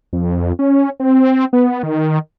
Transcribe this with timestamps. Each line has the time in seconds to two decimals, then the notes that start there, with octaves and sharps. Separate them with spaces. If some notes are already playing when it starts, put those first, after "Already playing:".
0.13 F2
0.59 C#4
1.00 C4
1.53 B3
1.83 D#3